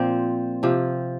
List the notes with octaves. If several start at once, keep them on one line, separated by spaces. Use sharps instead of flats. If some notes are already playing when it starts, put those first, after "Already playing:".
Already playing: A#2 F3 C4
C3 F3